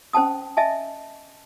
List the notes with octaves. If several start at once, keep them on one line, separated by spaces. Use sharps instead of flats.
C#4 C5 G5 A5 D#6
D#5 E5 G#5 A5